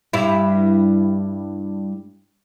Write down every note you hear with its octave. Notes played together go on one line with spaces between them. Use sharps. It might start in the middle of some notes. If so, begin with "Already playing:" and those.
G2 E4